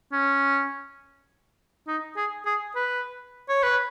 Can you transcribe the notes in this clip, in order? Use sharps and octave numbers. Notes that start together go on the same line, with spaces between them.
C#4
D#4
G#4
G#4
B4
C#5
B4